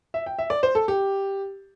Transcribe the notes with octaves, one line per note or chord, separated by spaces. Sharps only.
E5
G5
E5
D5
C5
A4
G4